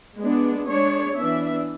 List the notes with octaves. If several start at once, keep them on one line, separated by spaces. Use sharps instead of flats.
G#3 B3 D4
G#3 D4 C#5
E3 B3 D4 E5